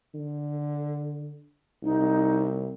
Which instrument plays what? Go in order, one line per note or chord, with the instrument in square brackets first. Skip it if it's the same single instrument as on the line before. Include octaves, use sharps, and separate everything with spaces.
[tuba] D3
[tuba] C2 [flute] D#4